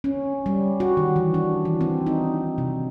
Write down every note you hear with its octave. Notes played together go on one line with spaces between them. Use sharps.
C#4
G3
F#4
D#3
E3
D4
E3
C4
D#4
C3